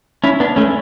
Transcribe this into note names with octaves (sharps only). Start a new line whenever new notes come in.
C#4 E4
B3 D4
A3 C#4